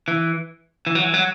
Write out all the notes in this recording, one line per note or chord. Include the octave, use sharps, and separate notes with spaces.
E3
E3
F#3
E3
F#3